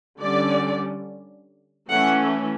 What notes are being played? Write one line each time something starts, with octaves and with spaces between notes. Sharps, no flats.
D3 G3 C#4 D5
E3 A3 C#4 F#5